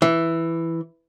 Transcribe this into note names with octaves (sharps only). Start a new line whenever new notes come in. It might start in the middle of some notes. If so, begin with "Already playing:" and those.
E3